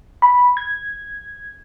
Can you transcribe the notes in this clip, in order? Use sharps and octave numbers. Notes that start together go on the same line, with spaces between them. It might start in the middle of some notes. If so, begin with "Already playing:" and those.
B5
G#6